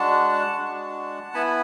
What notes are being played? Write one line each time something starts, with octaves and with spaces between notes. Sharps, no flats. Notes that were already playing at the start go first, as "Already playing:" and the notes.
Already playing: G#3 D4 F#4 F#5 A5
G#3 D4 F#4
B3 E4 G#5 B5